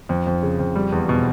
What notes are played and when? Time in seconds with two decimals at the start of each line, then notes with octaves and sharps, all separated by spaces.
0.09 F2
0.26 F2
0.42 C#3
0.59 F2
0.76 G3
0.92 E2
1.09 B2